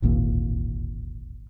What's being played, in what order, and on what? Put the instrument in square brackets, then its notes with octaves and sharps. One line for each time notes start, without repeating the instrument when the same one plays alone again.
[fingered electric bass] D1 G#1 D#2 A#2